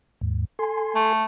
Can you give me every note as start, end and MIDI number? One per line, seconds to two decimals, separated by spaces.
0.21 0.45 39
0.21 0.45 44
0.59 1.13 69
0.59 1.13 80
0.59 1.13 84
0.95 1.24 57